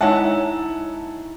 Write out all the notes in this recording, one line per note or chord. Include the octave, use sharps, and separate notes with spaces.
G#3 D#4 E4 C#5 E5 F#5 G#5 A5